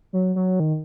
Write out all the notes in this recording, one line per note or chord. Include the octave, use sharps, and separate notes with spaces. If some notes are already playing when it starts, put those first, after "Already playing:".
F#3
F#3
D#3